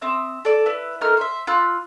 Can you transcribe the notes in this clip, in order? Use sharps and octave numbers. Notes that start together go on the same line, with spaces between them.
C4 E5 D#6
A4 D5
E4 B4
A3 D#4 A#4 F6
C5 E5
F4 B5 E6 F#6